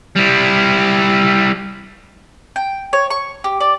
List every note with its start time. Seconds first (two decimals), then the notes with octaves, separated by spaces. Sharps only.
0.16 G3 E4
2.56 G5
2.93 C#5
3.10 C#6
3.44 G4
3.61 D5